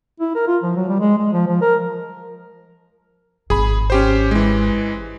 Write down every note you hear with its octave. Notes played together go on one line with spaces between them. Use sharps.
E4
A#4
F4
F3
F#3
G3
G#3
G#3
F3
F3
A#4
G#1 G#2 G#4 B5
C#4 G4 C5
E3 G#3